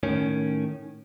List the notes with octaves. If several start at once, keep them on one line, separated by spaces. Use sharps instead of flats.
A2 D#3 C#4